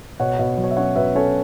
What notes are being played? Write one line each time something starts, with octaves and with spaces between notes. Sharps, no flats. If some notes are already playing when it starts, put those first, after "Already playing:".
B2 C#5 F#5
B2
F#3
C#5
E5
C#4 C#5 F#5
B2 B4 E5
C#4 A4 C#5